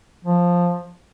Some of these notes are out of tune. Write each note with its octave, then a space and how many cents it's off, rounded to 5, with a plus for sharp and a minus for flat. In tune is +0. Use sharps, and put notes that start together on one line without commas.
F3 +5